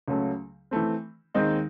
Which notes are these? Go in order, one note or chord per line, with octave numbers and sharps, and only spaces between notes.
C#2 C#3 F#3 A3
E3 A3 C4
D#2 D#3 G#3 C4 D#4